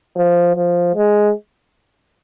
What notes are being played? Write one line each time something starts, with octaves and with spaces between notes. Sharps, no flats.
F3
F3
G#3